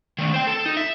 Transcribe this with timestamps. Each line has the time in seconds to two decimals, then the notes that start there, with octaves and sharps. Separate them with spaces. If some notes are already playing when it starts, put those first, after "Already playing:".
0.18 D#3 A3
0.34 C5 G5
0.47 A4
0.66 D#4
0.77 E5